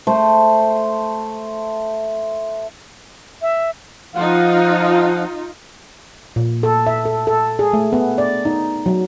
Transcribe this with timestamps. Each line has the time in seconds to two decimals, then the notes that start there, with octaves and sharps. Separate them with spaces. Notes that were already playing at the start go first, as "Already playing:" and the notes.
0.07 A3 C5
3.42 E5
4.15 F3 D#4 F4 F5 F#5
6.36 A#2
6.63 A4
6.87 E5
7.05 A4
7.27 A4
7.59 G#4
7.73 A3
7.93 B3
8.18 D5
8.45 D#4
8.86 F#3